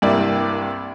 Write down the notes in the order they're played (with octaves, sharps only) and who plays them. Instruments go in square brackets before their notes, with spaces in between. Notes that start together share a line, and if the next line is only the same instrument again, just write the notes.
[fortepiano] C2 G2 A#3 E4 D5